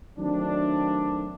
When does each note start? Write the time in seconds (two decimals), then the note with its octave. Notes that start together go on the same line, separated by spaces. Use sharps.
0.17 D#3 F#3 A3 C4 D4